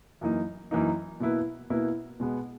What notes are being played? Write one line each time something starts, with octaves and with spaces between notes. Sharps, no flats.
F#2 E3 A#3 D#4
F#2 E3 A#3 D#4
B2 A#3 E4 B4
B2 A#3 E4 B4
B2 G#3 B3